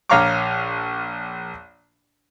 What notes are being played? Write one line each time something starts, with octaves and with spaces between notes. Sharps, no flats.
A#1 C#5 F5 A#5 C#6 D6